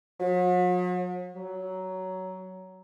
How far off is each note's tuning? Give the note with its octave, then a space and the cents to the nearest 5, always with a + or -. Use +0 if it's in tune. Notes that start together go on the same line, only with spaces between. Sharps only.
F#3 -45
F#3 +15